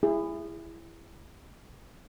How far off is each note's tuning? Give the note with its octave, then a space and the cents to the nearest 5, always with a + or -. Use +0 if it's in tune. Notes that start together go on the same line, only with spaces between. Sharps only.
E4 +15 G#4 -25